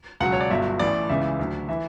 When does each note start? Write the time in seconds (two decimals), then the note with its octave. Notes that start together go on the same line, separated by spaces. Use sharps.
0.20 C#2 B2 F#3 F#5
0.32 C#5
0.41 D5
0.50 G1 G2 F#3 E5
0.79 A1 A2 E3 D5
1.09 C#2 C#3 E3 E5
1.39 D2 D3 F#3
1.69 E3 E5